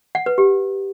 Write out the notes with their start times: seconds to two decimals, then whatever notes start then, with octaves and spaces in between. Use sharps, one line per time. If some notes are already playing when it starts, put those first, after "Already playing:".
0.15 F#5
0.26 B4
0.38 G4